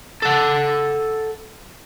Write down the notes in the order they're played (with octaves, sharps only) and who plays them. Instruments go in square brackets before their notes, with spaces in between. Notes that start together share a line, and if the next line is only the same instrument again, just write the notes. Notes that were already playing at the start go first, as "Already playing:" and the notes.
[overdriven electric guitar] A4 F#5